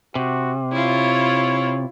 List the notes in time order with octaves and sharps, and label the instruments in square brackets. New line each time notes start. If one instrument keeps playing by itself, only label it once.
[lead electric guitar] C3 [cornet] F#4
[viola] E4 F4 [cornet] C#5